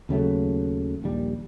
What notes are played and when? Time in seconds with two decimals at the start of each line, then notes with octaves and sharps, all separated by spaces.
0.09 D#2 C#3 F#3 A3
1.02 A#1 D#2 G3